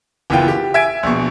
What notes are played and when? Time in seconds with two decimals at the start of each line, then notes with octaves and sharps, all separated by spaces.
0.30 F#1 E3 B3 F4 G5
0.48 G4
0.74 E5 G#5 G#6 D7
1.03 A#1 B2